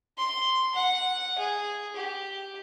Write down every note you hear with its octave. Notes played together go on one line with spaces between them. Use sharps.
C6
F#5
G#4
G4